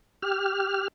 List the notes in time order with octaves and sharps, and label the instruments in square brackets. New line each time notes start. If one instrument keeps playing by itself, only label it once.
[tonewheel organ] G4 F6